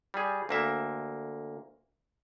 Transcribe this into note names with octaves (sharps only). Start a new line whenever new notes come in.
G3 G#4
D2 A#3 E5